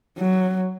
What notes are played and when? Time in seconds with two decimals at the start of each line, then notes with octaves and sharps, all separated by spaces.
0.18 F#3